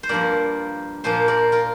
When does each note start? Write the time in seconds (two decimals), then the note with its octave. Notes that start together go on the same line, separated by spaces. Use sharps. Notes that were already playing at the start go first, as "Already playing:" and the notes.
0.03 C5
0.09 G2 F3 A#3 A#4 D5
1.04 A#2 F3 A#3 C5 F5
1.28 A#4 D5
1.52 F4 A#4